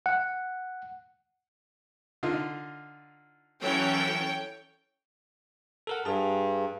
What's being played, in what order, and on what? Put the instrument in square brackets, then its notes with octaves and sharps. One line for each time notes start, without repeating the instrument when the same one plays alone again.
[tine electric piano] F#5
[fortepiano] D3 D#4 F4
[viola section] E3 F#3 C#4 [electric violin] A4 [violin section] C#5 G5
[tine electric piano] A4 A#4 F#5
[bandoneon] G2 [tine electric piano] G#4 A5